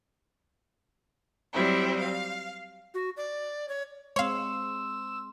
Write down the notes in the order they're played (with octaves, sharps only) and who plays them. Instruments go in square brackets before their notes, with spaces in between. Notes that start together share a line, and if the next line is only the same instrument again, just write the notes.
[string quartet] F#3 G3 C4 E4
F5
[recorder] F#4
D5
C#5
[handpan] G#3 C4 [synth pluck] C#5 F5 [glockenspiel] C6 [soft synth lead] E6